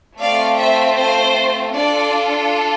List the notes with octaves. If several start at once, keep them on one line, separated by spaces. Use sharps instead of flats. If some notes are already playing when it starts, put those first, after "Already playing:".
A3 C4 F4 D5 F5
C5 E5
C5
D4 F4 A4 D5